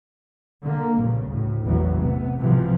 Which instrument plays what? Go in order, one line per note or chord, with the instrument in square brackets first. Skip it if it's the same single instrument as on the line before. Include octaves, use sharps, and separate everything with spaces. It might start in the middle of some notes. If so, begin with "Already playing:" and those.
[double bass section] D3 A#3
A#1 G2 C#3
D2 A2
A1 E2 A2 E3 F#3
C3 B3
B1 G#2 C3 E3 F3